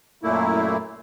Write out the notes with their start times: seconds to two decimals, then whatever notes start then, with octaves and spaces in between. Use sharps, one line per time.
0.23 F#2 A#2 A3 A#3 E4